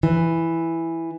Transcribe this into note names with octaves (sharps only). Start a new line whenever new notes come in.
E3